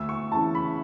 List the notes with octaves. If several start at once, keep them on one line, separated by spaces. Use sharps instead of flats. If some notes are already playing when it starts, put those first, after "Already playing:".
Already playing: D2 E6
C#6
C#3 E3 A5
B5